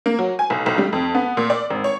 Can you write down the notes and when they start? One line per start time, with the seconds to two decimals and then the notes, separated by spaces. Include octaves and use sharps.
0.06 A#3
0.19 F#3
0.39 G#5
0.50 B1
0.66 B1
0.78 G3
0.93 F2
1.15 B3
1.37 A#2
1.50 D5
1.70 G#1
1.84 C#5